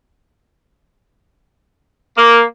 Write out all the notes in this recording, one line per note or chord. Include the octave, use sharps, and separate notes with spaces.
A#3